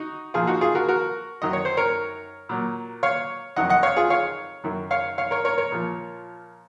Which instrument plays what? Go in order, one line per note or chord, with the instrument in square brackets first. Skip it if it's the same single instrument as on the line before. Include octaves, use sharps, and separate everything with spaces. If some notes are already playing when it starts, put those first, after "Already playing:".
Already playing: [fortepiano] D#4 F#4
A#2 F3 F4 G#4
D#4 F#4
F4 G#4
F#4 A#4
F#4 A#4
F#2 D#3 F#3 D#5
C#5
C5
A#4 C#5
A#2 F#3
C#5 F5
F2 D#3 F#3 D#5 F#5
D#5 F#5
C#5 F5
F4 G#4
C#5 F5
F#2 D#3 F#3
C#5 F5
C#5 F5
A#4 C#5
A#4 C#5
A#4 C#5
A#2 F3